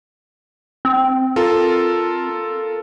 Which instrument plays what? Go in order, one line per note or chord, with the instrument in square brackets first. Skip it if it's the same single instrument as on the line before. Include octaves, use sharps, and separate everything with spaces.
[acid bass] C4
[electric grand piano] F4 A4 A#4